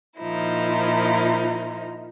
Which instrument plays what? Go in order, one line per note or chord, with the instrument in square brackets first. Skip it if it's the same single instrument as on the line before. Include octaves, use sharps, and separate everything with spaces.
[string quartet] A#2 F3 D#4 E4